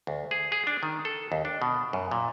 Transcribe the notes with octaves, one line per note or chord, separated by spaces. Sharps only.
D2
G#4
G#4
D4
D#3
A4
D#2
D4
B2
F#2
A#2